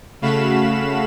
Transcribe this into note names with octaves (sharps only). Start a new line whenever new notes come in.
C#3 A3 F#4 F5 B5 E7